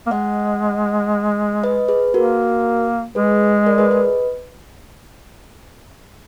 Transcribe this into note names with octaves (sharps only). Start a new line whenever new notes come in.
A#3
G#3 D#5 F#5
B4 D#5
G#4 B4
A#3 F#4 A#4
G#3 G#4 B4
A#4 D5
G#4 B4
B4 D#5